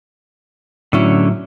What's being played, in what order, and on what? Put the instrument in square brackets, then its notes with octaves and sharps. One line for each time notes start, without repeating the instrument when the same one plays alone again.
[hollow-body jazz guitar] A2 F#3 E4 [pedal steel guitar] D3 C#4